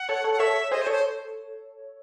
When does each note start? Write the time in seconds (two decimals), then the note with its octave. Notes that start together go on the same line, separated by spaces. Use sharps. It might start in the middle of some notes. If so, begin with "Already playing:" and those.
Already playing: F#5
0.09 A4 C#5
0.24 A4 C#5
0.33 F#5
0.39 A4 C#5 E5
0.71 G#4 C5 D#5
0.82 C5
0.86 A4 C#5
0.92 C5